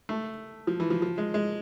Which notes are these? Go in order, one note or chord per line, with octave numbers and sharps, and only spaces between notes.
A3
F3
E3
F3
F3
G#3
G#3